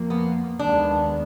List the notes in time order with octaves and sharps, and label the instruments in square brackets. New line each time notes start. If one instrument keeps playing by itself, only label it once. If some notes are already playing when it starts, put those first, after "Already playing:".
Already playing: [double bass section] F2 F3 A#3
[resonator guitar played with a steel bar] B3
[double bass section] D#2 D#3 G#3 B3 [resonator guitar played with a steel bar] D4